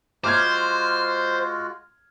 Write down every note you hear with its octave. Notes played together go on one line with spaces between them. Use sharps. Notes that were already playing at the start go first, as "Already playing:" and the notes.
G#3 F4 F#4 C5 D6 F6 G#6